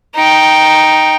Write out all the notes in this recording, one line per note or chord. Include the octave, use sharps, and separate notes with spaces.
D#4 G5